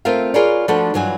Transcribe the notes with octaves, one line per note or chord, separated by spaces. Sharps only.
A3 C4 F4 A#4 E5 F5
F4 G#4 A#4 B4 C#5 D5
F3 A3 D4 F#4 A4 B4
G2 E3 F#3 F4 G#5